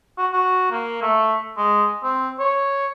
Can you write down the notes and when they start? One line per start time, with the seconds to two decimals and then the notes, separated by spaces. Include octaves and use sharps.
0.18 F#4
0.33 F#4
0.71 A#3
1.02 A3
1.57 G#3
2.03 C4
2.39 C#5